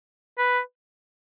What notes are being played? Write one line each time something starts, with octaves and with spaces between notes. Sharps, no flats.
B4